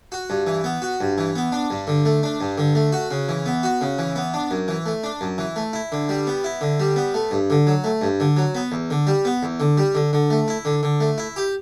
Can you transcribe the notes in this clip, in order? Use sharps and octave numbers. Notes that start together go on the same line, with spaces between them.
F#4
G2
E3
B3
F#4
G2
E3
B3
D4
G2
D3
A3
D4
G2
D3
A3
F#4
C#3
E3
B3
F#4
C#3
E3
B3
D4
F#2
E3
A3
D4
F#2
E3
A3
E4
D3
G3
B3
E4
D3
G3
B3
A3
G2
D3
F#3
A3
G2
D3
F#3
B3
E2
D3
G3
B3
E2
D3
G3
D3
D3
A3
E4
D3
D3
A3
E4
G4